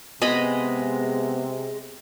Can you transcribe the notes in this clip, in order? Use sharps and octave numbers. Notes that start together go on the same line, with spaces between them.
C3 G#3 B3 D#5 B5